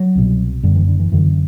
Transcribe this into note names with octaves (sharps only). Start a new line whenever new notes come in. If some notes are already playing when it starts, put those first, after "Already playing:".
Already playing: F#3
C2 B2
F#1 F#2 D3 G3
E3
D3
E3
F#1 F#2 D3 E3